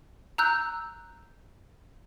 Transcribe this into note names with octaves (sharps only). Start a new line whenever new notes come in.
A#5 E6 F#6 G6